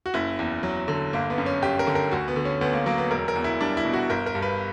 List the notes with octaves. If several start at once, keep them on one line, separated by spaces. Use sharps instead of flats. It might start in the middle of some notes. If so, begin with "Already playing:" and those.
F#4
F#1 E4
E2
F#3
D3
G1 A#3
B3
F#2
C#4
G1 G4
A#4
D3
A#4
D2 F#4
B3
D3
C#4
D2 B3
A#3
F#3 A#3
B3
E1 A#4
A#4
E2
E4
G3 D4
E4
B2
F#4
G1 A#4
A#4
G2
B4